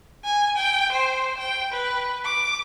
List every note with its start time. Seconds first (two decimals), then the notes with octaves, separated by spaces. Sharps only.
0.24 G#5
0.57 G5
0.92 C5
1.38 G5
1.72 B4
2.25 D6